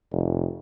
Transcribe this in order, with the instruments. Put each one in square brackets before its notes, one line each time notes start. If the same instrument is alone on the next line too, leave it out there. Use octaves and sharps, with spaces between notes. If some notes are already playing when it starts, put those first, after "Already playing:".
[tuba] F1